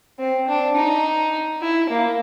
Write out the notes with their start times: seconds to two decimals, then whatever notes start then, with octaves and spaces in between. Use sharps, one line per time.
0.19 C4
0.48 D4
0.76 D#4
1.61 E4
1.90 A#3